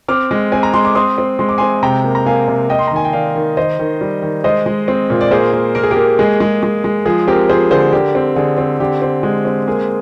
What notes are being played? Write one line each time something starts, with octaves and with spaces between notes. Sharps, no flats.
C4 D6 F6
G#3
C4 G#5
A#5
G#3 C6
D6
C4 C6 D#6
C4
G#3 C6
D6
C4 G#5 C6
C3 G5 A#5
A#3
A#5
A#3 F5 G#5
C3
A#3 D#5 G5
C6
A#5
D#3 G#5
G5
D#3 D5 F5
D#3
D#3 C5 D#5
D#3
G3
D#3
G#3 C5 D#5
G#3
C4
A#2
D5
A#3 G#4 C5
A#3
A#3 A#4
G#4
G4 A#4
A#3
G#3 G#4
G#3
G#3
G#3
F3 G#4
C4 G4 A#4
F3 G#4 C5
D3 G#4 C5
D3 G4 A#4
C4
D3 G#4
C4
D3 G4
C4
G#3
C4
A#3 G#4